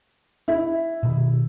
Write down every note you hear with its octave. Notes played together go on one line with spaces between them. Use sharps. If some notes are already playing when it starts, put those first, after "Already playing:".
E4
B2 D#3